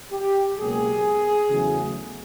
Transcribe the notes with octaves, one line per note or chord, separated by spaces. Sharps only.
G4
C#2 B2 F#3 A#3 G#4
E2 C#3 F#3 A3